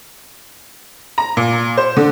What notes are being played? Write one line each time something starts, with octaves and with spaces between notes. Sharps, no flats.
A#5
A#2
C5
D3